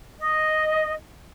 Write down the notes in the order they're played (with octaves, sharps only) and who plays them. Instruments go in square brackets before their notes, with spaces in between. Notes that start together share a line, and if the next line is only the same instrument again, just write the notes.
[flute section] D#5